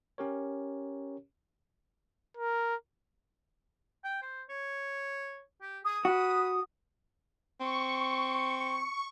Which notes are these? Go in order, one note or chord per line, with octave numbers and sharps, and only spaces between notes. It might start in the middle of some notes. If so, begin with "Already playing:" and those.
C#4 G4 A#4 C#5
A#4
G5
C5
C#5
G4
G#4 D#6
F#4 B4
C4 C#6